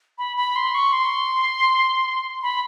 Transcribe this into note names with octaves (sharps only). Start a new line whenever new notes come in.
B5
B5
C6
C#6
C6
B5